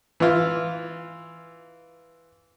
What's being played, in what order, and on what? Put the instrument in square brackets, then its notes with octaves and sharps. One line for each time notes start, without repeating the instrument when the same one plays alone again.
[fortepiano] E3 F4